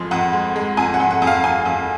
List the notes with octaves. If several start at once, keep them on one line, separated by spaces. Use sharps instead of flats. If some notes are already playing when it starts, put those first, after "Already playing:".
Already playing: F2 F3 G#3
F2 F#5
G#3
G#3
F2 G#5
F#5
F2
F#5
F2
F5
F2 G#5
F2